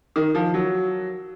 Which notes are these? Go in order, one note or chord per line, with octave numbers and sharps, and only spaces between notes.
D#3
F3
F#3